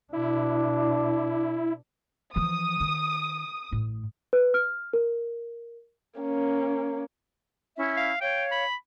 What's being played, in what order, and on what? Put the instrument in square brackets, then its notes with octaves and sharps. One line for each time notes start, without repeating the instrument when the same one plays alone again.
[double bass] B2 D4 [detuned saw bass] E4
[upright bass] E3 F3 [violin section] D#6
[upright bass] D#3
A1 A2
[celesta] B4
F6
A#4
[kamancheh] A#3 C#4
[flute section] C#4 E4 E5
[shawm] F5
[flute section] C#5 F5 [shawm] G5
[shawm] B5